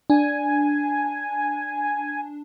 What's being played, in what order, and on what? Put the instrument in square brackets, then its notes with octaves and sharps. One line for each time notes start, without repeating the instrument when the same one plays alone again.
[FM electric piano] D4 [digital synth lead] G#5